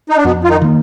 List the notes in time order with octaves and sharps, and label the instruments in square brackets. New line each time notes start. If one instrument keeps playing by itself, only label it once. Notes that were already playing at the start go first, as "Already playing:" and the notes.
[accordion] D#4
D4
[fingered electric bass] F2 [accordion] B2 B3
[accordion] F4
D#3 D#4
[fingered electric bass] D#3 A#3